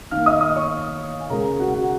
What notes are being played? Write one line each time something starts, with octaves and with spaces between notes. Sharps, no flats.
D#3 A#3 F5 F6
D#5 D#6
D#5 D#6
C#5 C#6
G#5
C#3 G#3 A#4 A#5
F#4 F#5
F#4 F#5